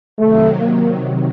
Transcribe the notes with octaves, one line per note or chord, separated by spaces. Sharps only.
C3 D#3 F#3 A3
A#3